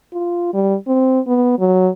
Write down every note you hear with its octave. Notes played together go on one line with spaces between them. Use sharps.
F4
G3
C4
B3
F#3